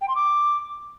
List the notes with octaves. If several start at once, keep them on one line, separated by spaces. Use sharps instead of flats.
G5
C6
D6